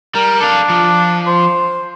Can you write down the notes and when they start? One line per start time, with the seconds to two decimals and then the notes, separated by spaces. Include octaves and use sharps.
0.15 G3 A#4
0.41 D4 A4 F5
0.70 F3
1.27 C5